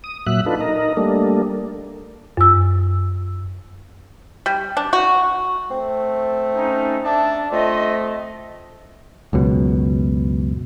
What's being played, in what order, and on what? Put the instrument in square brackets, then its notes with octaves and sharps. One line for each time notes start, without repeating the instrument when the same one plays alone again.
[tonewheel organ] D#6
A#2 F#3 E5 F#6
D4 D#4 F4 A4 B4
D#4 A#4 D#5
G3 A3 A#3 D4
[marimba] F#2 E6
[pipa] G3
D4
F#4
[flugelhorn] A3 [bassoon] C4
[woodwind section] C#4 D#4
[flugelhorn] D4 [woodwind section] E5 A5
[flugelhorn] A3 [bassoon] C4 [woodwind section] F4 D#5
[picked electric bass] C#2 F#2 B2